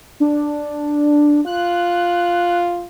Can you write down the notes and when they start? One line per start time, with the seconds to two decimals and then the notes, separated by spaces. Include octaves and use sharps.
0.20 D4
1.46 F4 F#6